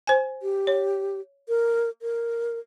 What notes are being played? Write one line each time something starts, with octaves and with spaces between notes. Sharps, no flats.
C5 G#5
G4
C#5
A#4
A#4